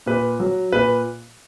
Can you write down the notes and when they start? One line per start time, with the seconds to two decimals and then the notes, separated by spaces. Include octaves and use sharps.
0.06 A#2 B4
0.40 F#3
0.72 A#2 B4